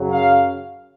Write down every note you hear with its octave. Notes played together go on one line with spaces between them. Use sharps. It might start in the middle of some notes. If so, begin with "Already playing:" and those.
Already playing: F#2 C#3 F#3
F5